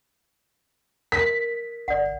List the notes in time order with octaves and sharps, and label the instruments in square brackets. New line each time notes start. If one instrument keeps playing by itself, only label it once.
[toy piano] A#4 [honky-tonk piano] B6
[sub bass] G1 [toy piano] D5 F#5